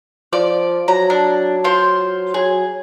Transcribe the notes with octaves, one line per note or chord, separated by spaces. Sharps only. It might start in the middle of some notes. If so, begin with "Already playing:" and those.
F3 D5
F#3 A#5
D4
F4 C5
F#3 G#4